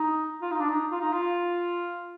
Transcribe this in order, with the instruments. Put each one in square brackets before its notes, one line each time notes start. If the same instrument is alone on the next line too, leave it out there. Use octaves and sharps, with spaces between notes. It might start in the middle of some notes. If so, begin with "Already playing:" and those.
Already playing: [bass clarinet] D#4
F4
D#4
D4
D#4
F4
D#4
F4